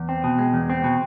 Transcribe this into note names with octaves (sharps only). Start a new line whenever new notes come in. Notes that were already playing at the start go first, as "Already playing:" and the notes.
Already playing: E2
C4
B2
G#3
E2
C4
B2